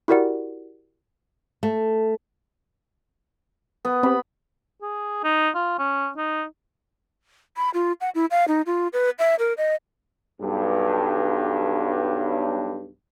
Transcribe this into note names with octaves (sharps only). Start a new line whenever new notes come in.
E4 F#4 G4 A#4 D5 F#5
A3
B3
C4 G4 B5
G#4
D#4
F4
C#4
D#4
B5
F4
F#5
E4
F5
D#4
F4
B4
E5
A#4
D#5
B1 G2